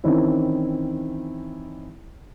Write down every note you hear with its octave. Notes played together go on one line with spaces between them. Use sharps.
D#3 E3 C4 C#4 E4